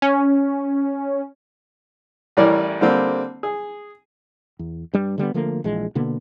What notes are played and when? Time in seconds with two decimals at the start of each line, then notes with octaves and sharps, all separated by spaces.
0.02 C#4
2.37 A1 E3 G3 A#4 C#5 D5
2.81 D3 G3 A#3 C4
3.43 G#4
4.59 E2
4.94 G2 G3
5.18 D3 G3 A3 B3
5.34 D3 F3 A3 A#3
5.64 A#1 E3 G#3
5.95 B2 D3 A#3 B3